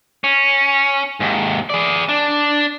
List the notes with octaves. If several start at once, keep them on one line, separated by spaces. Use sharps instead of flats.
C#4
D#2 G#2
G#4 D5
D4